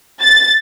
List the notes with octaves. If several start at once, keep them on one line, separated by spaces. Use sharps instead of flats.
A6